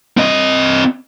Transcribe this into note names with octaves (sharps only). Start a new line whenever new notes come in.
C4 D#5